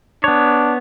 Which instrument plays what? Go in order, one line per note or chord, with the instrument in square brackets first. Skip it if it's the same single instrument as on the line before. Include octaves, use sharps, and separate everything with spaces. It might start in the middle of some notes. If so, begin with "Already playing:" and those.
[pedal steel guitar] B3 C#5 [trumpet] D4